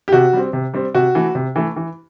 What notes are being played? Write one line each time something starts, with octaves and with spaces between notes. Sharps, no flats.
G4
C3 F#4
G3 C4
C3
G3 C4
C3 F#4
E3 A3
C3
E3 A3
E3